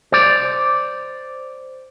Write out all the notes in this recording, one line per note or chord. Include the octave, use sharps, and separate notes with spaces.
C5 D5